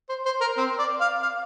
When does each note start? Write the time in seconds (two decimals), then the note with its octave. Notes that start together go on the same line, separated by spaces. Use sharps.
0.09 C5
0.25 C5
0.41 A#4
0.58 C4
0.79 D5
1.01 F5
1.22 F5